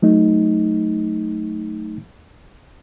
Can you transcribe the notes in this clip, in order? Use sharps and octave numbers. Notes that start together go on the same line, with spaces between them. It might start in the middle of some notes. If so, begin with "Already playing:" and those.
F#3 A3 D#4